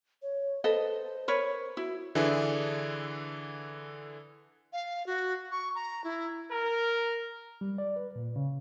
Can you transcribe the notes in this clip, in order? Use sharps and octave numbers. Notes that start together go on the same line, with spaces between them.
C#5
A4 B4 C5 D#5
A#4 B4 C#5
E4 F#4
D3 E3 D4 E4 G#4
F5
F#4
C#6
A#5
E4
A#4
G3
D5
B4
A#2
C#3